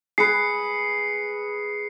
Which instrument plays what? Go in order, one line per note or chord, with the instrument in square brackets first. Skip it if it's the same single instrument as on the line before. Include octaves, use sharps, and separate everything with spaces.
[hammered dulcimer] G#4 B4 [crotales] C7 C#7